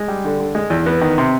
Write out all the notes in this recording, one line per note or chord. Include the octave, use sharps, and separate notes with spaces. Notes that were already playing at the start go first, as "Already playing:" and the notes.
Already playing: G#3
G3
D3
D3
G#3
E2
B3
D#3
C3